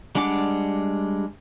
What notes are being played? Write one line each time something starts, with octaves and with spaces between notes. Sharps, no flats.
G3 G#3 D4 F#5 D6